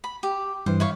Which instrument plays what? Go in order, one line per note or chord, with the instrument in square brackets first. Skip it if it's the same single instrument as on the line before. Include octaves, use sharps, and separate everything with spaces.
[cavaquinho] B5
G4
[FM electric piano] G2 E3 [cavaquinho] C5
[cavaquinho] E4 C#5 F5